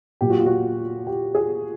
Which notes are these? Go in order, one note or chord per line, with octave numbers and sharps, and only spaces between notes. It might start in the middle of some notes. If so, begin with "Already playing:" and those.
A#2 F#3 G4
F#4
F4
F#4
G4
G#4